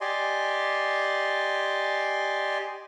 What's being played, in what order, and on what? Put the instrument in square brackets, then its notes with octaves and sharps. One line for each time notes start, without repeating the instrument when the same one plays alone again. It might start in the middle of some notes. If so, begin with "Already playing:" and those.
[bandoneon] G4 D5 D#5 G#5 C6